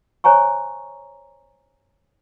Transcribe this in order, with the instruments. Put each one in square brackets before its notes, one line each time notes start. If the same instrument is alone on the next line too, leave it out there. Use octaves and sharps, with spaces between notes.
[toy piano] C5 C#5 G#5 A#5 C#6